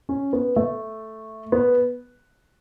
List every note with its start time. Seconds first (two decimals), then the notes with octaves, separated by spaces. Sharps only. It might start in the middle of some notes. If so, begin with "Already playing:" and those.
0.09 C#4
0.33 B3
0.56 A3
1.52 B3